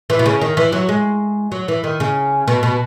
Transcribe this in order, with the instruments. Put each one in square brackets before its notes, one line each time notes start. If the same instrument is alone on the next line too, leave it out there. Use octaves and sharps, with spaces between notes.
[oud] E3
B2
C#3
D#3
E3
F#3
G#3
F#3
E3
D#3
C#3
B2
B2